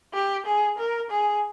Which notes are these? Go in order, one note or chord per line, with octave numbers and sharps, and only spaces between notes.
G4
G#4
A#4
G#4